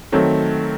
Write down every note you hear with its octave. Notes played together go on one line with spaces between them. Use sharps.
D#3 F#3 A3 C4